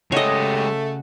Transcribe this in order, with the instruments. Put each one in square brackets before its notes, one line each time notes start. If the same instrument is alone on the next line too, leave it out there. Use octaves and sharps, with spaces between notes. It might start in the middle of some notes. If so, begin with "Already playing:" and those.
[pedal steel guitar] C#3 F#4 F#5 [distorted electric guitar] G#3 G4 [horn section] A3 [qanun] C#5 D#5